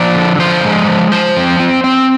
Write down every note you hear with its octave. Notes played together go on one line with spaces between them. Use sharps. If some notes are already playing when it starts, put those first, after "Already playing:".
Already playing: F3 D5
D3
F3 C5
G#3
F3
F3 C5
C4
C4
C4